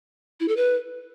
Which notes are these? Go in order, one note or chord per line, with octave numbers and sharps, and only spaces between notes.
E4
A4
B4